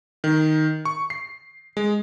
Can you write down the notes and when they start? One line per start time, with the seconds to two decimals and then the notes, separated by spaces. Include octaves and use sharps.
0.24 D#3
0.85 C#6
1.10 C7
1.77 G#3